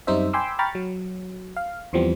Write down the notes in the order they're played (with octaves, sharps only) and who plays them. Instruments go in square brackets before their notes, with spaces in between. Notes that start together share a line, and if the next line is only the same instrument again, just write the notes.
[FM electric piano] F#2 G3 C4 D#4 C5 E5
G5 G#5 B5 C6 D6 E6
G5 A#5 B5 C#6 F6 A6
F#3
F5
E2 E3 F3 G3 B3 C4